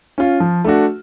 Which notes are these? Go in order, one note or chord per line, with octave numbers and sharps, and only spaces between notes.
C#4 F4
F3
A3 D4 F#4